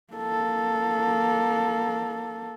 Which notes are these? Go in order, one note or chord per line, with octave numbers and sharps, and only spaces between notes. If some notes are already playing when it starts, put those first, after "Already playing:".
A#3 A4